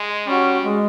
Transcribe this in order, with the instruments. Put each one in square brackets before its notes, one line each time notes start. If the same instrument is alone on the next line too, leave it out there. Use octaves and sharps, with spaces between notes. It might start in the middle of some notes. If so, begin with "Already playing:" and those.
Already playing: [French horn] G#3
[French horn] G3 [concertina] C#4 F#4
[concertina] G#3